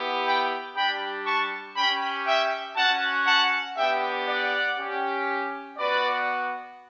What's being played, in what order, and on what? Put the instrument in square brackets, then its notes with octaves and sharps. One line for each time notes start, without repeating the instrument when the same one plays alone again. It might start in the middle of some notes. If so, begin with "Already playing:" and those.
Already playing: [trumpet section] B3 E4 G4
G5 B5
G3 D4 G4 G5 B5
A5 C#6
C#4 G4 G5 B5
E5 G5
C#4 F#4 F#5 A5
F#5 A5
B3 D4 G4 E5 G5
D5 F#5
C#4 G4
B3 F#4 B4 D5